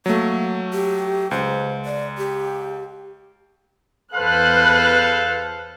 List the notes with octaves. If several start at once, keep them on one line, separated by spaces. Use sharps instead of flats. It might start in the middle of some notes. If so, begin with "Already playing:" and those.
F#3 A3 A#3
G4
C#2 C5
D5
G4
E2 A4 B4 C5 F5 F#6